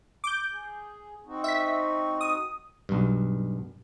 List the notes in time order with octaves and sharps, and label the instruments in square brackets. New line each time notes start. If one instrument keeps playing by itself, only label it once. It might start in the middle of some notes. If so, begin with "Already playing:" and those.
[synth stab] D6 G6
[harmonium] G#4
C4 D#4 F#4
[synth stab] E5 B6
D#6
[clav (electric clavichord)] B1 G2